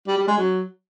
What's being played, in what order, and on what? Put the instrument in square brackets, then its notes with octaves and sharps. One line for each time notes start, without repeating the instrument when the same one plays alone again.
[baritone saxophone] G3
G3
G#3
F#3